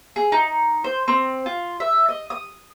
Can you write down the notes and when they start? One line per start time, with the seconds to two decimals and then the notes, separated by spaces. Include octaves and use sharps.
0.16 G#4
0.32 D#4
0.84 C5
1.08 C4
1.46 F4
1.80 E5
2.09 D#5
2.30 D#6